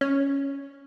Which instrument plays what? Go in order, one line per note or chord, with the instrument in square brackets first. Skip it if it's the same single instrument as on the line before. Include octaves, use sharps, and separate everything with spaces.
[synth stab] C#4